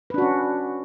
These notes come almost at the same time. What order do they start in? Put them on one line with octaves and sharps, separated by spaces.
B4 D4 F#4 C#4